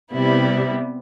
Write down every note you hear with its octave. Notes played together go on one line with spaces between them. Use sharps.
C3 G3 B3 E4